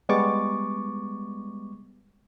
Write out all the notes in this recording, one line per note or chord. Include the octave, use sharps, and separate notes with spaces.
G3 G#3 B3 C#6 D6 A6